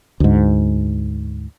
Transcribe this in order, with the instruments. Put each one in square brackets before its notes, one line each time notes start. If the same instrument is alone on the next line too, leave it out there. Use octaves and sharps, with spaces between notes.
[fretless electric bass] D2 G#2